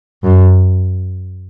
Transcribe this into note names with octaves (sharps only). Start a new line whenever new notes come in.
F#2